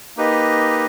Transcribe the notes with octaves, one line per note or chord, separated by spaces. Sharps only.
A#3 D#4 G4 B4 D#5